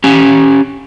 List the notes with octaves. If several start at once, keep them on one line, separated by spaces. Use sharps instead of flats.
C#4 G4 G#5